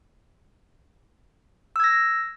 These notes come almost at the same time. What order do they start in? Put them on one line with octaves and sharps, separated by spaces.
E6 G#6 A#6